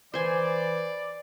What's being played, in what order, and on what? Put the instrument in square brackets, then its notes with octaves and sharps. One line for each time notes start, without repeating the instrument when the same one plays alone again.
[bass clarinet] E3 [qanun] C5 G#5 [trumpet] D5